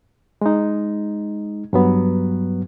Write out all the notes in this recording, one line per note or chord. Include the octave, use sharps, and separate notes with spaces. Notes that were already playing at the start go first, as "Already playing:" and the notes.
G#3 D#4
G2 F#3 B3